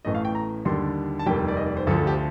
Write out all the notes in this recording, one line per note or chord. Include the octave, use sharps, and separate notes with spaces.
A1 A2 A3 D#5
F5
G5
A#5
D#2 D3 G3 C6
A5
F1 D#2 D#3 G3 G5
D5
D#5
D5
C5
D2 D3 F3 A4
A4
G4